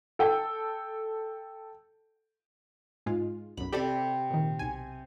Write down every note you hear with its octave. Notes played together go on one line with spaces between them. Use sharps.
A4 G5
G#2 G#3 F4
B1 F#2 B5
C3 G4 A4 D5 B5
A#2 D#3
B1 G#5